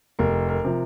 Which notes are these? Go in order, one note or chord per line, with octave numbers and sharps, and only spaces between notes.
F1 A#4
A#4
C3 F3